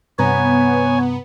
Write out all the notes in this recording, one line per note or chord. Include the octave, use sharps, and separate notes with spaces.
G2 C3 B3 C#5 G#5 A#5